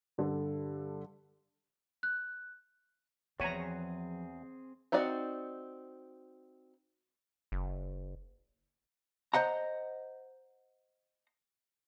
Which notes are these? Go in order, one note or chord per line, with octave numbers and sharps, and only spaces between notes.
G2 D3 A4
F#6
E2 F3 C4 F#4 G#4 B4 C#5 A#5
C4 D#4 F#4 D5 F#5
F#1
C5 D#5 F#5 A#5